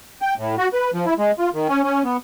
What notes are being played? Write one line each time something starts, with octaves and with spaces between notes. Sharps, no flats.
G5
A2
F#4
B4
F3
E4
G#3
F4
D#3
C#4
C#4
B3